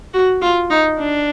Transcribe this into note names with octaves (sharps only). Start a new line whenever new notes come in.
F#4
F4
D#4
D4